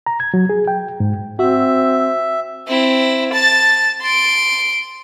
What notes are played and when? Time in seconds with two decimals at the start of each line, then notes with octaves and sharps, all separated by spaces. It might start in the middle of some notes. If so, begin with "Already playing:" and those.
0.06 A#5
0.20 G#6
0.34 F#3
0.49 G#4
0.68 G5
1.00 G#2
1.39 C4 F#4 E5
2.68 C4 E4
3.34 A5 A6
4.01 C6 D7